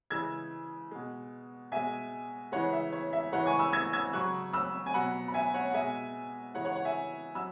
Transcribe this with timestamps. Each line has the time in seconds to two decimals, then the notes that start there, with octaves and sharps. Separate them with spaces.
0.10 C#3 E3 G#3 E6 G#6
0.91 B2 G#3
1.72 B2 G#3 E5 G#5
2.52 C#3 E3 G#3 C#5 F#5
2.73 E5
2.92 C#5
3.13 E5
3.32 C#3 E3 G#3 C#5 F#5
3.46 G#5 C#6
3.59 B5 E6
3.73 E6 G#6
3.93 E6 G#6
4.13 C#3 F#3 C#6 F#6
4.53 B5 E6
4.86 G#5
4.94 B2 F#3 F#5 B5
5.28 B5
5.34 E5 G#5
5.54 C#5 F#5
5.70 F#5
5.74 B2 G#3 E5 G#5
6.55 C#3 E3 G#3 C#5 F#5
6.65 C#5 F#5
6.75 C#5 F#5
6.85 E5 G#5
7.35 F#3 B5 E6